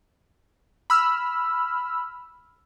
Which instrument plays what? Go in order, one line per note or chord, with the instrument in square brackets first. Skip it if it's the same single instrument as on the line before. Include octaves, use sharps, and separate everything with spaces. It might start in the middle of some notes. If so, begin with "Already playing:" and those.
[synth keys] B5 E6 F6